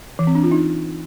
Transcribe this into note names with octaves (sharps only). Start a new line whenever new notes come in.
E3
C4
D4
F4
D#4